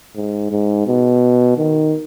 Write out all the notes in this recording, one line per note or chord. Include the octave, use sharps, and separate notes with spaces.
G#2
G#2
B2
D#3